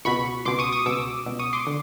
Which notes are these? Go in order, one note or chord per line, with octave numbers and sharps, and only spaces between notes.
C#2 B2 B5 C#6
C#2 B2 C6 D6
C#6 D#6
C#6 D#6
C#2 B2 D6 E6
C#2 B2
C#6 D#6
C6 D6
D3